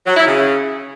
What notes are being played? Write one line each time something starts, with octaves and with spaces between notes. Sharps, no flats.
F#3
E4
C#3